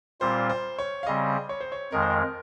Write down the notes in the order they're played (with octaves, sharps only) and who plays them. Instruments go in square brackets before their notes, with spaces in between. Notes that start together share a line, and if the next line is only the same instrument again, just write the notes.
[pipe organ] A#2 G3 C4 F4 [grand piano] C5
[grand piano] C5
C#5
F5
[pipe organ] C#3 G3 C4 [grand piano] D#5
[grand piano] C#5
C5
C#5
[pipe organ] F2 D#3 G#3 [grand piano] A#4
[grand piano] C5
A#4